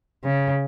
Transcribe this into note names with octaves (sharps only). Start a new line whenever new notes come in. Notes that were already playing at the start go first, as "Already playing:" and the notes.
C#3